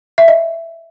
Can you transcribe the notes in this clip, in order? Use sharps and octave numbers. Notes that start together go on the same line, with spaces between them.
E5
D#5